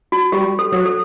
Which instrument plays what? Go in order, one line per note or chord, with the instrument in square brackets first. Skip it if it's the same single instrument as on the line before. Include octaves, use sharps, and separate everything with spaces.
[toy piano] F#4
[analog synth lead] G3 [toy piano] G4
[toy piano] A4
[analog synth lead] F#3
[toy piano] A4